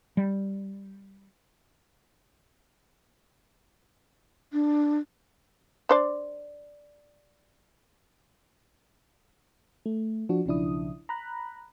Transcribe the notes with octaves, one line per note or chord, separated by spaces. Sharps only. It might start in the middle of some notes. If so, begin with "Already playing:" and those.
G3
D4
D4 C5 D5
A3
F3 D4 F#4
B1 C#3 F3 D4 E4 D#6
A#5 B5 F#6